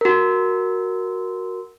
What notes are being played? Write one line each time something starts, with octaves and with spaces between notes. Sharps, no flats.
F#4 A#4